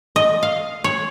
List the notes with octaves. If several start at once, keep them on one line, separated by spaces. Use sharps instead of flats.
D#5
F5
C#5